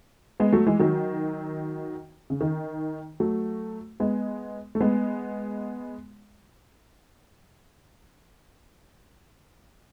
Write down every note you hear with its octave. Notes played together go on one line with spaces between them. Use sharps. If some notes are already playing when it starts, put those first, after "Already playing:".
G#3 B3
F#3 A3
E3 G#3
D#3 F#3
C#3
D#3
F#3 A3
G#3 B3
A3
G#3 B3